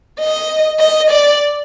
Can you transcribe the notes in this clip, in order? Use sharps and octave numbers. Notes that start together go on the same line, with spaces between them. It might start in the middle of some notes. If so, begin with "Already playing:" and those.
D#5
D#5
D5